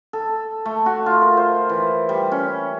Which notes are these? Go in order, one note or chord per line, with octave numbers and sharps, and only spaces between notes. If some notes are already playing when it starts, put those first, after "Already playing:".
A4
A3
F#4
F4
A#4
C5
E3
G3
C#4